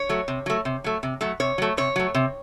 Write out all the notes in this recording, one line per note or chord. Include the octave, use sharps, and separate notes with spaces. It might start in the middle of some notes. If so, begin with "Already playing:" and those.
Already playing: C#5
F#3 A3
C3
F#3 A3
C3
F#3 A3
C3
F#3 A3
C3 C#5
F#3 A3
C3 C#5
F#3 A3
C3